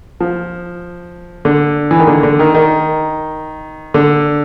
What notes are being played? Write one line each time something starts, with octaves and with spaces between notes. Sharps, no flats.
F3
D3
E3
D#3
D3
D3
D#3
D#3
D3